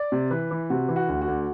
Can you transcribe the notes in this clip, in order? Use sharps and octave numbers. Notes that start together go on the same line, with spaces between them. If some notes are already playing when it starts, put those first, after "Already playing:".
Already playing: D5
C3
E3 B4
E3
C3 F#4
E3
F#4
D2
F#4
D2